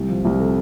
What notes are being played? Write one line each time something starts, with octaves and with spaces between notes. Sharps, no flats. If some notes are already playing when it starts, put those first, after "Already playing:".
Already playing: C2
F3
C2
C3 A4